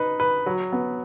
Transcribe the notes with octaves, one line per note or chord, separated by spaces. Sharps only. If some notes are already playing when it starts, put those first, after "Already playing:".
Already playing: D#4 B4
B4
F#3
B3